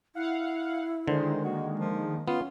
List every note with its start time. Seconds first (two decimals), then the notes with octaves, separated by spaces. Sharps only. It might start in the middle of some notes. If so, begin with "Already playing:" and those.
0.15 E4 F5 F#5
1.08 D3 D#3 G#3 C5
1.44 A#3 F#4
1.79 F3
2.28 B3 C#4 F4